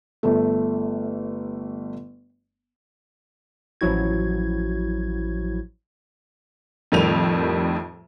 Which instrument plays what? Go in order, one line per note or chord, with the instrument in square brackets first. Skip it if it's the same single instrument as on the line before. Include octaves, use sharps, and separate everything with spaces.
[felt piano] G1 A3
[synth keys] A1 F3 F#3 E4 F#4 G#6
[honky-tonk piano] F2 A2 D#3 G3 D#7 F7